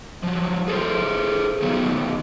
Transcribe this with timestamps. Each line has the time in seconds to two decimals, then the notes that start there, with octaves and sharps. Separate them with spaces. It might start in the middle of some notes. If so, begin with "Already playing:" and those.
0.23 F3 F#3
0.68 G#4 A4 C5
1.62 F#2 D#3 F#3 A3 B3 D#4